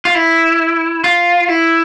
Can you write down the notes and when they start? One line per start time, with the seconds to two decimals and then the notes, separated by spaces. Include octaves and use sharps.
0.05 F4
0.15 E4
1.04 F4
1.48 E4